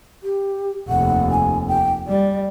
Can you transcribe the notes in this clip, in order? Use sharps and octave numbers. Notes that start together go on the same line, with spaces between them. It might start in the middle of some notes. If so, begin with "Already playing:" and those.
G4
F1 D#2 F#5
G#5
G5
G3 D5